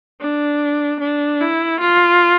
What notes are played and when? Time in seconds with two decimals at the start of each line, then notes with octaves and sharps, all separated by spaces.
0.21 D4
1.00 D4
1.41 E4
1.80 F4